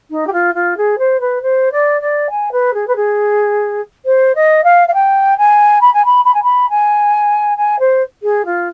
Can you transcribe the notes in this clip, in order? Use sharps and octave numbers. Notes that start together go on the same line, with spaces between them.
D#4
G4
F4
F4
G#4
C5
B4
C5
D5
D5
G#5
B4
G#4
B4
G#4
C5
D#5
F5
F5
G5
G#5
B5
G#5
B5
B5
G#5
B5
G#5
G#5
C5
G#4
F4